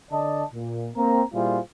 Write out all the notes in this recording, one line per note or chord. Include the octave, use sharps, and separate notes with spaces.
D3 D5 D#5 A5
A#2
A#3 C4 A#5
A#2 G3 E4 F4 G#4 C5